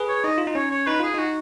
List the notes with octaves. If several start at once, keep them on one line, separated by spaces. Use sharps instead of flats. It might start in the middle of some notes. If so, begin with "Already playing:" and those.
Already playing: G#4 B4
C#5
D#4 D#5
F4
D#4
C#4 C#5
C#5
D#4 B4
F4 G#4
D#4 F#4